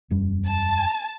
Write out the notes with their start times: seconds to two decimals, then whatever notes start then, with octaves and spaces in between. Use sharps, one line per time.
0.10 E1 F#2 G3
0.47 A5